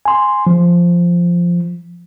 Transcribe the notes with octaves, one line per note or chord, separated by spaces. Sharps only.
G#5 C6
F3